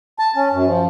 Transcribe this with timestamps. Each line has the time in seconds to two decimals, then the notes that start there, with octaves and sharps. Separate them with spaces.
0.19 A5
0.36 C#4
0.52 F#2
0.67 F3